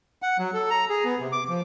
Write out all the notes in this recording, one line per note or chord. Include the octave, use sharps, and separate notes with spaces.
F#5
F#3
A4
A#5
G#4
B3
C3
D6
F3